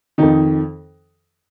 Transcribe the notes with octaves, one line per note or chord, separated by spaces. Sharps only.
F2 D#3 D#4